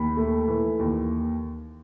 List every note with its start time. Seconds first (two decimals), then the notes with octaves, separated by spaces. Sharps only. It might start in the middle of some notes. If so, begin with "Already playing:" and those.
Already playing: D#2 B5
0.17 A3
0.48 E3
0.79 D#2